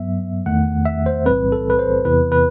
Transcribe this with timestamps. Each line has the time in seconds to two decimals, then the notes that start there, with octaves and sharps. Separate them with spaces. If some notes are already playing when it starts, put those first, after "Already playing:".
Already playing: G2 F#3 B3 E5
0.46 E2 D#3 A3 F#5
0.86 E5
1.06 C5
1.26 B1 A2 E3 G3 C4 B4
1.52 A4
1.70 B4
1.79 C5
2.05 E2 C3 E3 B3 B4
2.32 B4